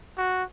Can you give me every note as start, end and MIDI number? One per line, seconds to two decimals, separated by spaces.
0.18 0.44 66